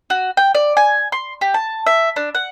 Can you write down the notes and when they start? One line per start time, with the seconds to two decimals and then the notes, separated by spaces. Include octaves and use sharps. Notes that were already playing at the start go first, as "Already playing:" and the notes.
0.10 F#4
0.37 G5
0.55 D5
0.77 G#5
1.12 C6
1.41 G4
1.54 A5
1.87 E5
2.16 D4
2.35 F#5